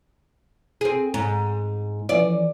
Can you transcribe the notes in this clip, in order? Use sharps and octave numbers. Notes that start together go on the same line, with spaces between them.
C4 G#4
G#2
E3 F3 C#4 D5